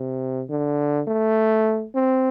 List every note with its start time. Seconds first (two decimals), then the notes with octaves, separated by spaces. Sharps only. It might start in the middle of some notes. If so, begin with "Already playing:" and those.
Already playing: C3
0.50 D3
1.08 A3
1.95 C4